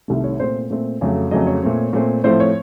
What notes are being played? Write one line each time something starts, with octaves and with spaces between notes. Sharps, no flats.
C2 C3 D#3 A3
C#5
A#2 A3 C4 C5
A#2 A3 C4
F2 C#3 F#3 A3
F2 C#3 F#3 A3 D#5
C#5
A#2 A3 C4
A#2 A3 C4
A2 F3 A3 C4 C5
C#5